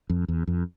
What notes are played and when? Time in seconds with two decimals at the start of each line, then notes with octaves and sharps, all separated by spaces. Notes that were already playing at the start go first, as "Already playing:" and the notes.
0.10 F2
0.28 E2
0.48 F2